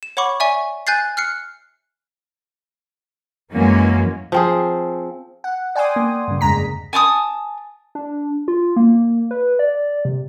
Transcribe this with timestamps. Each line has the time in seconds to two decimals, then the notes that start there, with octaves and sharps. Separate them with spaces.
0.03 E7
0.17 C#5 F#5 B5 C#6 D6
0.40 D5 E5 G#5 C#6
0.87 G#5 F#6 G6 A6 C7
1.17 F6 F#6 C7 C#7
3.53 F#2 E3 F#3 G#3 A#3 C#4
4.32 F3 C4 G#4
5.44 F#5
5.75 D5 G5 G#5 C6 D#6
5.96 A#3
6.28 G2 C#3
6.41 F2 C#3 G#3 A#5 B6
6.93 G#5 A5 C#6 D#6
7.95 D4
8.48 F4
8.76 A#3
9.31 B4
9.59 D5
10.05 C3